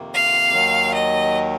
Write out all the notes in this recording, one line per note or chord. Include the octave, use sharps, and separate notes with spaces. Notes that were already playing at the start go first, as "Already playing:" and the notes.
Already playing: F2 C3 D#3 A#3
F5
D#2 D#3 F#3
D#5